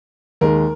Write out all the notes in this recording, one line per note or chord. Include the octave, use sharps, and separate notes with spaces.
D#2 D#3 G#3 A#4